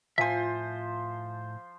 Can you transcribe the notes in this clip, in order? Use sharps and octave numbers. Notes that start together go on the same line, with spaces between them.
A2 F3 C5 E5 G#5